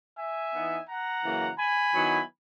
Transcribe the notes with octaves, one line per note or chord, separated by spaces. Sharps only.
E5 G#5
E3 B3 D#4
F#5 A#5
F#2 C#3 E3 A#3
G#5 B5
D#3 F#3 B3 E4